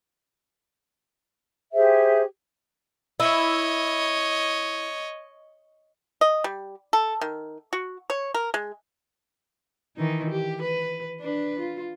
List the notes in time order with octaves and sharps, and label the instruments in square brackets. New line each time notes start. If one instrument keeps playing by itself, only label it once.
[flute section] G4 G#4 C5 E5
[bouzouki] E4 [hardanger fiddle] C#5 D#5
[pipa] D#5
G3
A4
D#3
F#4
C#5
A#4
G#3
[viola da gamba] D#3 E3 D#4
G4
B4
D4 B4
F4